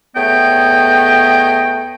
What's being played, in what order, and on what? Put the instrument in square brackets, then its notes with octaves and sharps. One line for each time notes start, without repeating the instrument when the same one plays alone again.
[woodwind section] E2 A3 B3 C#5 D#5 G5